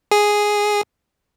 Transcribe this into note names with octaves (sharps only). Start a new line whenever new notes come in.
G#4